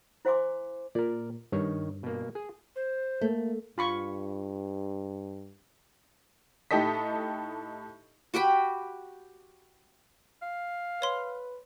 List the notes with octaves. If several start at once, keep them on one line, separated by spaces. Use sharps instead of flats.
E4 C5 F5 G#5 C6 D6
A#2 A#4 D5
G2 D#3 C#5
B2 A#3
G#4
C5
A3 A#3
G2 F4 B5 C#6
A2 D#4 G4 A4 D#5 B6
F#4 G4 G5 B5
F5
B4 C#5 C6